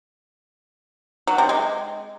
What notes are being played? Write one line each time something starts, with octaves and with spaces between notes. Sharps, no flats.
F#3
C3
G#3